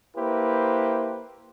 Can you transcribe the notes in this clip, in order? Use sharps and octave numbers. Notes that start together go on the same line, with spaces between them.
A#3 E4 G4 B4 C5